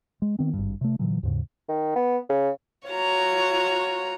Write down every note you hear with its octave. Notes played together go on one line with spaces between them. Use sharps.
G#3
D#3 B3 C4
G#1 G2
C3 A3
A#2 D3 E3 F#3
D#2 G#2 C#3
D#3
B3
C#3
F4 F#4 C#5 A#5